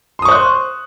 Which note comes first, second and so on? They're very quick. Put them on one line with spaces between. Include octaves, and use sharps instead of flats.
C6 D#6 C#6 C5 F#6